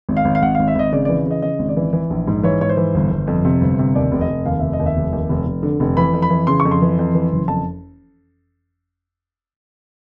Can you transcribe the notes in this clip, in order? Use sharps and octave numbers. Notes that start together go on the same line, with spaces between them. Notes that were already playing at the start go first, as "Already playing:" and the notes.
G#1
F5
G#1
F5
G#1 F#5
G#1 F5
E5
G#1 D#5
C#3 D5
E3 D5
C#3 D#5
C#3 D#5
G#1
D5
E3
E3
A#1
G#2
E3 C#5
G#2 C#5
C5
E3
G1
G1
F2
C3
G1
C3
D#2 D5
F1
D#5
F1
D#2 F5
F1 E5
D#5
D#2
E5
F1
D#2
F1
F1
D3
F1
E3 B5
F2
B5
E3
C#3 C6
C#6
F2
C6
E3
F2
E3
F#1
F2 A5